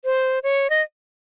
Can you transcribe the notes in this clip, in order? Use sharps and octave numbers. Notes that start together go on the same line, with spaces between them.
C5
C#5
D#5